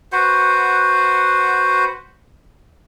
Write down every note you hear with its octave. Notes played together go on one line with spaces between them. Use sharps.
F#4 B4 C5 F#5